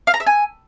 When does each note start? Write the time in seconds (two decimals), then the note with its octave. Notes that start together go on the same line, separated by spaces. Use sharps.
0.07 F5
0.14 A#5
0.20 E5
0.27 G#5